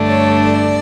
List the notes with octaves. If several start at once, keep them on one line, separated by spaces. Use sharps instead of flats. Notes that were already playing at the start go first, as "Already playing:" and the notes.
Already playing: G2 D3 A3 D4
C#5
D5